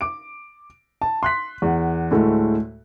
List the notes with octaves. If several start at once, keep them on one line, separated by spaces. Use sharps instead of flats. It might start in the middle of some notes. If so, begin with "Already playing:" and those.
D6 D7
A5
C6 F#6 B6
E2 F#5
D2 A2 G#3 A3